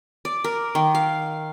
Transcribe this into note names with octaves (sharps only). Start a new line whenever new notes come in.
D5
A#4
D#3
F5